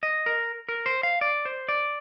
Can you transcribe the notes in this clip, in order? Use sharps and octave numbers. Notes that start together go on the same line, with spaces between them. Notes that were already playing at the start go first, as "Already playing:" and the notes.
D#5
A#4
A#4
C5
F5
D5
C5
D5